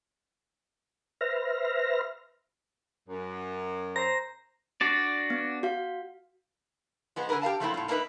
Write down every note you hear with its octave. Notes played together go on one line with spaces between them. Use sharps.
B4 C5 E5 F6 A#6
F#2
C5 A#5 A#6
D4 F#4 D5
B3
F#4 F5
F3 G#3 B3
D3 E4 G#4 A#4 B4
G4 A#4 F5 A5
F3 F#3 A3 A#3 C4 E4
A2 F4
A#3 D4 D#4 A#4 B4 E5